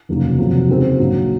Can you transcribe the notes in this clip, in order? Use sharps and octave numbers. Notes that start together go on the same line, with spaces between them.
F1 D#2 C#3 F#3 A#3
F1 F2 C3 D#3 F#3
D#2 C#3 G#3 C4 F#4
A#1 G#2 F#3 A#3